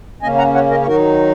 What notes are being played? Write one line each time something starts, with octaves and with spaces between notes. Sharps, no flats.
C#3 A#3 C#4 D#5 G#5
F#5 A#5
C#5 F#5
A#4 D#5
C#5
D#3 F#3 D#4 F#4 A#4